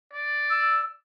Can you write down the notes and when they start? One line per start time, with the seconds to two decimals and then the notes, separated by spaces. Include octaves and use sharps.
0.13 D5
0.50 E6